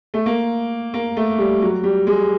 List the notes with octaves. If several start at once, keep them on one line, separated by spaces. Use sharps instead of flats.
A3
A#3
A#3
A3
G3
F#3
G3
G#3